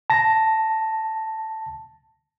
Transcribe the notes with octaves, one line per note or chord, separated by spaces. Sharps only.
A5 A#6